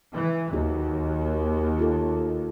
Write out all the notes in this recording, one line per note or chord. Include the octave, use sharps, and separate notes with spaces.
E3
D#2 D#4 F#4 G#4
F4 A4